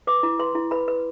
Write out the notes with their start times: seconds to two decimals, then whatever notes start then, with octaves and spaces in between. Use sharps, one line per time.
0.07 B4 D6
0.23 E4
0.39 B4 C6
0.55 E4
0.71 B4 B5
0.88 B4